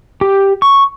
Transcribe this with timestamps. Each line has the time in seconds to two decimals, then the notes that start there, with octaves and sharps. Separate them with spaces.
0.21 G4
0.62 C#6